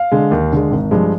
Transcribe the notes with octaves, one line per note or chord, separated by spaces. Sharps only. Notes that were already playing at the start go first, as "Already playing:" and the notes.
Already playing: F5
D3 G#3
D#2
D3 G#3
G#1
G2 F3 G#3